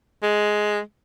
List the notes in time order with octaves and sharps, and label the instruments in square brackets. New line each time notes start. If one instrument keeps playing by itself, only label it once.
[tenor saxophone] G#3